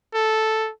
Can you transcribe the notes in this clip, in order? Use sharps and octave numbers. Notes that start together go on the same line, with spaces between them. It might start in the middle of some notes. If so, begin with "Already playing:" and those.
A4